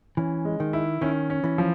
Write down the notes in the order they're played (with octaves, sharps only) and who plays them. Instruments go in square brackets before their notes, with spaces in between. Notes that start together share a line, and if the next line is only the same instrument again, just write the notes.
[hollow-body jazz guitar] E3 [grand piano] C#4
[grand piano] G#3
[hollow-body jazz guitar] D#3
[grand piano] E4
[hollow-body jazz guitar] D#3 [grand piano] C#4
[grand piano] C#4
[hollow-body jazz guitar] E3
[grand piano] F3